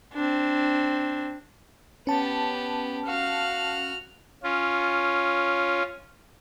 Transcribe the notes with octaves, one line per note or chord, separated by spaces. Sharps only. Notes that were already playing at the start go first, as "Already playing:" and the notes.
C4 D4
B3 C#4 G4 A5
F#4 F5 F6
C#4 F4